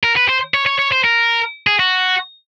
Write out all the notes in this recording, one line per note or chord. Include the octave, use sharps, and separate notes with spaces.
A#4
B4
C5
C#5
C#5
C#5
C5
A#4
G#4
F#4